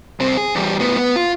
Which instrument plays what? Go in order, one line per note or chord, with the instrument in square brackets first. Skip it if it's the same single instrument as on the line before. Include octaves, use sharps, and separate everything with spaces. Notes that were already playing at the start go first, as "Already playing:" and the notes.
[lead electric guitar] C2 C4
G#4
E2 G3
A2 B3
B3
F4